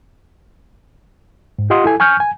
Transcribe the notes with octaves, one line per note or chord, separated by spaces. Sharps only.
G#2
F4 G4 D#5 F#5 C6 D#6
E4 A4 G#5
G#5 C#6 F6 G6
G#5